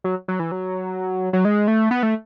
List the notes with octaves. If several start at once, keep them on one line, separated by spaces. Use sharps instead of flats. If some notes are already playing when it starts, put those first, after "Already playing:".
F#3
F#3
E3
F#3
F#3
G#3
A3
B3
A3